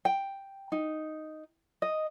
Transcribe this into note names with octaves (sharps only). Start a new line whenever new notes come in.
G5
D#4
D#5